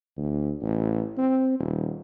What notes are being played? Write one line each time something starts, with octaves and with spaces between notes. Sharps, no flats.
D2
A1
C4
D#1